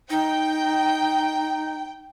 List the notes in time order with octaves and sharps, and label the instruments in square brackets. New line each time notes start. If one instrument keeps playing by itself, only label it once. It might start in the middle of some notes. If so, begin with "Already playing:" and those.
[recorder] D#4 [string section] G5